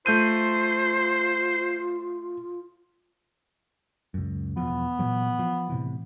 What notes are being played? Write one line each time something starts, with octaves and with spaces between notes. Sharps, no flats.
A3 F4 C5 G6 D#7
C#2 F#2
E1 E2 F3 B3
A#2 E3 F#3
F3
A2 C3 E3